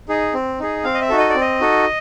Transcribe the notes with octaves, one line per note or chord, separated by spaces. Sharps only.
D#4 G#4
C4
D#4 G#4
C4 F5
D#5
E5
D#4 F#4 A4
D#5
D5
C4
D#5
D#4 F#4 A4